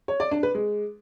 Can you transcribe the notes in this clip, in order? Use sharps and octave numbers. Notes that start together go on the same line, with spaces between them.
C#5
D5
D4
B4
G#3